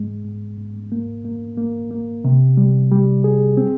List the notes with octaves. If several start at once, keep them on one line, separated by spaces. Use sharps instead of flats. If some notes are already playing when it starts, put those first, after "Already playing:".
Already playing: G#2 G#3
G#2
G#2
A#3
A#3
A#3
A#3
C3
G3
G3
G#4
C4